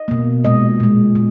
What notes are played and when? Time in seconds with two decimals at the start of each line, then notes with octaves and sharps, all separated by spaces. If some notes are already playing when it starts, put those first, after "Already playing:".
Already playing: D#5
0.08 B2 A#3
0.44 A#2 G#3 D#5
0.80 A#2 G#3
1.15 B2